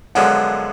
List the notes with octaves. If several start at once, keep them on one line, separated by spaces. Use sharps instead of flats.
F#2 D3 F3 G#3 B3 F#5